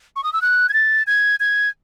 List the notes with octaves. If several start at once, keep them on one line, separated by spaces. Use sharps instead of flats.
C#6
D#6
E6
F#6
G#6
A6
G#6
G#6